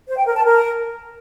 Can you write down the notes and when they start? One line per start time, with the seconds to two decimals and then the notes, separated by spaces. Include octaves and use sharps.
0.07 C5
0.17 G5
0.26 A#4
0.35 A5
0.44 A#4